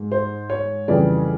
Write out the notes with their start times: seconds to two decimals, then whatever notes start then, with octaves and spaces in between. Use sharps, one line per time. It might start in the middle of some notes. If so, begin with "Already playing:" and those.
Already playing: G#2 G#3
0.12 C5
0.50 C#5
0.88 F2 C#3 E3 G3 D5